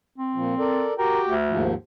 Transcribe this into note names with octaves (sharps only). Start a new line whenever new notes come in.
C4
A#2 F3
A4 A#4 D5
F#4 G4 A#4 G5
D2
D#2 G#2 F3